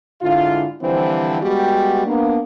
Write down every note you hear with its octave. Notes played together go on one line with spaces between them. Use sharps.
G#2 D3 E4 F4
D3 E3 F3 G3 C4
G3 G#3 B3 F#4 G4
A#3 B3 D4